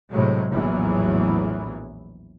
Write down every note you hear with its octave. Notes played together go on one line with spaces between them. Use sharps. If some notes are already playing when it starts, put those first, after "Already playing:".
A2 C3 F#3 G#3
A#1 E2 A2 E3 F#3